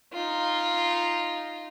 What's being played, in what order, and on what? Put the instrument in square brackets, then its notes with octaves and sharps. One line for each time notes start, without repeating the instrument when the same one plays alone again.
[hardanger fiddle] D#4 F4